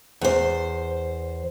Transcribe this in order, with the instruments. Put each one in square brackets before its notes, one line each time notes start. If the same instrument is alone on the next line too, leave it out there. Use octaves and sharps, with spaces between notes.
[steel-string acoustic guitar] E2 C5